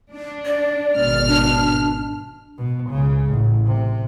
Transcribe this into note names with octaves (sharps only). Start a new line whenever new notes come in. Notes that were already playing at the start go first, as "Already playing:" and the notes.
D4
D5
G#1 B2 F6
D4
B2
C#2 C#3
A1
C3